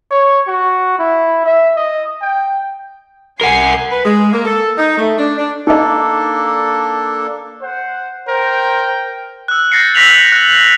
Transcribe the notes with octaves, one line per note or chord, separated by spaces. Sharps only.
C#5
F#4
E4
E5
D#5
G5
C2 A#4 F#5 G#5 C7
B4
G#3
A#3
A4
D#4
A3
D4
D4
A#3 D4 D#4 A4 D#5
C5 F#5
A#4 C5 G5
E6 F#6
G6 A6 A#6 C7 C#7
E6 F#6 A#6 B6 F7 F#7
F#6